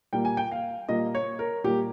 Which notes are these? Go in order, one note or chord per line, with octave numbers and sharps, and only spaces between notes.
A#2 G3 A#3 G5
G#5
G5
F5
A#2 G3 A#3 D#5
C#5
A#4
A#2 G3 A#3 G4